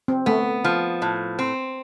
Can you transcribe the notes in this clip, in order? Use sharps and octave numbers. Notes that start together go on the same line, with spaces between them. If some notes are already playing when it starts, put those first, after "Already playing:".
C4
A3 B3
F3
A2
C4